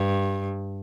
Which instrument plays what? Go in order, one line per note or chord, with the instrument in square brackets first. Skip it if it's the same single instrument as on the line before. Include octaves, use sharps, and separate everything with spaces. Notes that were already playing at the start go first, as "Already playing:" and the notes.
Already playing: [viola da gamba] G2